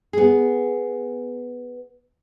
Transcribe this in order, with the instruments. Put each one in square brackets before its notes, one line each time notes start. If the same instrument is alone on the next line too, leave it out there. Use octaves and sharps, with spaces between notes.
[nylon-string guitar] B3 G#4